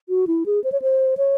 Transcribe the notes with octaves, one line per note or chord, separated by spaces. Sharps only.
F#4
E4
G#4
C5
C#5
C5
C#5